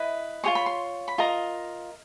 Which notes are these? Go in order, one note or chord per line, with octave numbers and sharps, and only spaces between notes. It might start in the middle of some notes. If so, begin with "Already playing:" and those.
Already playing: E4 B4 D#5
F4 G#4 C#5 C6
B5
C6
B5
F4 A#4 D#5 A#5